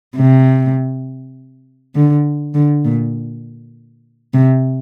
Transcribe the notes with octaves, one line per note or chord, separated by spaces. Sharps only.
C3
D3
D3
A#2
C3